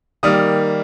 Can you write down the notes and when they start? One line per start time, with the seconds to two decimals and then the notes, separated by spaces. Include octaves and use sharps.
0.23 D#3 G3 A#3 D#6